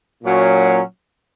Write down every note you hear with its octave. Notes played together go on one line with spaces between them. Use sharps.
A#2 F#3 C#4